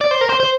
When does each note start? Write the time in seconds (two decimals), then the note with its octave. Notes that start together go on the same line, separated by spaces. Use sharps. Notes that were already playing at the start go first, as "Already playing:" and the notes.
0.01 D5
0.11 C5
0.21 A#4
0.29 C5
0.40 C5